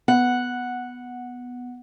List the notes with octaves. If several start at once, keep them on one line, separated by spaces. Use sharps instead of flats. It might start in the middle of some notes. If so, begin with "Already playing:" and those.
B3 F#5